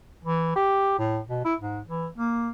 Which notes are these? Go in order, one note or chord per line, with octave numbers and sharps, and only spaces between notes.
E3
G4
A2
B2
E4
G#2
E3
A#3